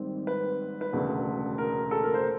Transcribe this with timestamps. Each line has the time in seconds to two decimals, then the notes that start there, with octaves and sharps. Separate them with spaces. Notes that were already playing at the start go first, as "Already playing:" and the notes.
Already playing: G#1 G#2 D#3 G3 C4
0.27 B4
0.81 B4
0.93 E1 D2 C#3
1.58 A#4
1.91 A4
2.03 A#4
2.14 C5